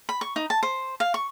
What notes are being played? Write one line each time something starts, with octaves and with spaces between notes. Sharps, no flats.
B5
C#6
D#4
A5
C5
F5
C#6